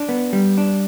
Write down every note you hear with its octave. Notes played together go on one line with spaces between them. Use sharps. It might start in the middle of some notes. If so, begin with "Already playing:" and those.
Already playing: D4
B3
G3
D4